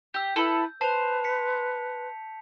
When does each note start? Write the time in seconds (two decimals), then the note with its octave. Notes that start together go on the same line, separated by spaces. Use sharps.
0.14 G4 E6 G6
0.36 E4 A4 B4
0.81 B4 C5 A5 F7
1.24 B6 C#7